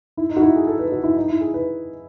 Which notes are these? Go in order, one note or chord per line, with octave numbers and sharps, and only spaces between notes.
E4
D#4
F#4
E4
G#4
A4
B4
F#4
E4
D#4
E4
G#4
B4